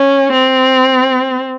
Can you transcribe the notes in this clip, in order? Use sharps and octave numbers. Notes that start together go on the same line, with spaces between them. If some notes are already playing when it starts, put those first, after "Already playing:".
Already playing: C#4
C4